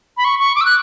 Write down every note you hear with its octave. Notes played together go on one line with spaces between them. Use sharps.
B5
C#6
C#6
D6
E6
F#6